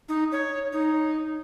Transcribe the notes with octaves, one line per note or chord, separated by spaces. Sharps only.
D#4
C#5
D#4